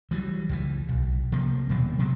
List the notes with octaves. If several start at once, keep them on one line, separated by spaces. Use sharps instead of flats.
E3 F#3 G3
C#2 E3
B1
C3 F3 A#3
D#1 B2 F#3 A#3
C3 F#3 G#3